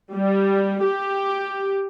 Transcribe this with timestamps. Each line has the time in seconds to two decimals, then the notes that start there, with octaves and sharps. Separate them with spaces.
0.13 G3
0.83 G4